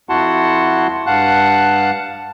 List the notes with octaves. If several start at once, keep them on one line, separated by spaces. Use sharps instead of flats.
F2 E4 F#4 F#5 A5 C6
G2 F5 F#5 A5 F#6